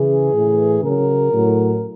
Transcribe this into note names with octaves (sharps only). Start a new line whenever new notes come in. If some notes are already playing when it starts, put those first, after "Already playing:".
Already playing: C#3 E3 G#4
A2 E3
C#3 F#3 A#4
A2 F#3